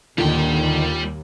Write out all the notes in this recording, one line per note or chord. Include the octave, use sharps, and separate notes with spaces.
D#2 A#2 D3 D#3 G3 G5